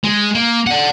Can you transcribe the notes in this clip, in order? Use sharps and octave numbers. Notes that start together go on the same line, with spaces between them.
G#3
A#3
D5 F#5